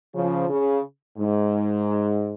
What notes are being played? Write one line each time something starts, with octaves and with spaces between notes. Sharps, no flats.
C#3 F3
C#3
G#2